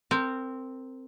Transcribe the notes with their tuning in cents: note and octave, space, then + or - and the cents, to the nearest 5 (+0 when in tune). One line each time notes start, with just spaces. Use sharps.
C4 +0 A#4 -25